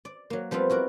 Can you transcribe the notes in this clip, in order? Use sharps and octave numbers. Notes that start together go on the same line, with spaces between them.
D5
F#3 A#3
F3 G3 B3 C4 F4
E4 F#4 A#4 D5